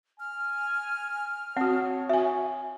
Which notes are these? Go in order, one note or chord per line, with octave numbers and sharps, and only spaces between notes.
G#5 F6
C4 F#4 C#5 F#5
F#4 E5 G#5